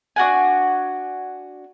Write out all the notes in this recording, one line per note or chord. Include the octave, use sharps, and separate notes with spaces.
D4 F#4 F#5 G#5